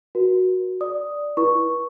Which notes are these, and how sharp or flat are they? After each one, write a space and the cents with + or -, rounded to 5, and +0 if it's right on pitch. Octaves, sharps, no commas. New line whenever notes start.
F#4 +0 A#4 +40
D5 +0 D#6 +0
E4 +0 B4 -35 C#6 +0